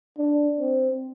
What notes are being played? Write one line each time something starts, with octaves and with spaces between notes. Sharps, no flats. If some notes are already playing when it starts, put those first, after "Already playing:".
D4
C4